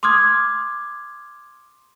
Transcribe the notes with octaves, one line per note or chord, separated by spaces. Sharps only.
C6 D6 D#6 F6 G#6